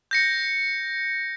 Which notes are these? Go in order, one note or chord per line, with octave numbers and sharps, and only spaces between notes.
G6 A#6 C#7